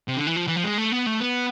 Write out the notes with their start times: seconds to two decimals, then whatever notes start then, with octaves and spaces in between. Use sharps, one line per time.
0.08 C3
0.17 D3
0.27 E3
0.36 F3
0.47 E3
0.56 F3
0.64 G#3
0.78 A3
0.92 B3
1.06 A3
1.20 B3